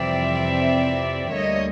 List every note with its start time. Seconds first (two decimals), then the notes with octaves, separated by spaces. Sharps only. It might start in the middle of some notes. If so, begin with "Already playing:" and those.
Already playing: F2 C3 E3 G3 C4 D5 E5
1.33 D2 D3 G3 A#3 C#5 D#5